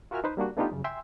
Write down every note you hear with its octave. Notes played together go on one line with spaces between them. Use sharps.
F4 F#4 A#4 E5 G#5 F6
D#4 B4 C5
G3 A#3 D4 F#4
A3 B3 D4 D#4 F4 G4
F#2 C#3
E5 G5 G#5 C6 E6